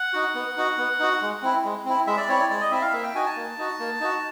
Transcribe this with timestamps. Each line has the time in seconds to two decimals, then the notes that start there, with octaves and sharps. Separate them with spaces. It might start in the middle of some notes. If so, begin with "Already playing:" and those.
Already playing: F#5
0.13 D#4 F#4
0.35 B3
0.57 D#4 F#4
0.78 B3
0.99 D#4 F#4
1.21 G#3
1.43 C4 E4
1.64 G#3
1.85 C4 E4
2.07 G#3 E5
2.17 D5
2.28 C4 E4 C#5
2.39 D5
2.49 G#3 D5
2.61 D#5
2.71 C4 E4 E5
2.82 F5
2.93 A#3 E5
3.03 G5
3.15 D#4 F#4 G#5
3.26 A5
3.36 A#3
3.58 D#4 F#4
3.79 A#3
4.00 D#4 F#4